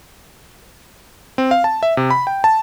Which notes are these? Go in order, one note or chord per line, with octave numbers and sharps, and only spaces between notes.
C4
F5
A5
E5
C3
B5
G5
A5